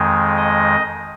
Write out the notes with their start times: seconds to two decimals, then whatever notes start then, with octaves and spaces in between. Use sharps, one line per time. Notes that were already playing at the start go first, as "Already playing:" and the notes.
Already playing: F2 D#3 G#3
0.37 D#5